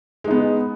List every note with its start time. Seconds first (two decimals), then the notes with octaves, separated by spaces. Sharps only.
0.24 G#3
0.28 D#4
0.31 B3